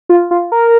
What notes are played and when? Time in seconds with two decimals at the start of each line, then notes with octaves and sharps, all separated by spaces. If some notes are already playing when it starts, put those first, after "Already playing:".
0.09 F4
0.31 F4
0.52 A#4